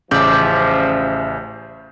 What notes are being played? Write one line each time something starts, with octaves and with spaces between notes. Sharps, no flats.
A1 C#3 F3 D5 E5 G6